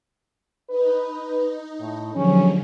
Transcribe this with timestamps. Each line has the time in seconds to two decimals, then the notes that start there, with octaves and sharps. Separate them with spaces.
0.68 D#4 B4
1.79 A2
2.14 D#2 D3 F3 F#3 G#3 C#4